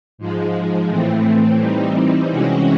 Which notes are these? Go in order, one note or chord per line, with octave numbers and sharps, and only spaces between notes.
G#2 F3 G#3
A2 E3 A3 C4
E3 G3 C4 D#4
C3 E3 G#3 C#4 F#4